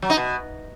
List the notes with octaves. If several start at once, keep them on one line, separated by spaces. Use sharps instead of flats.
F#3
D#4
B2